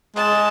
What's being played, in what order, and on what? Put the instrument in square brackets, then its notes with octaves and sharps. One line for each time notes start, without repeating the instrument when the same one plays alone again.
[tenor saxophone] G#3 [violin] A5